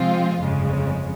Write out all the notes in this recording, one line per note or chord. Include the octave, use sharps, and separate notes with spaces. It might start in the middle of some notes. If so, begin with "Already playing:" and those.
Already playing: C3 F3 G#3 C4 F4
G1 F2 C#3 G#3